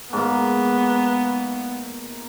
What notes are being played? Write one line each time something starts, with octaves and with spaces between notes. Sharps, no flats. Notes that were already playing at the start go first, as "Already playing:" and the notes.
G#2 A#3 B3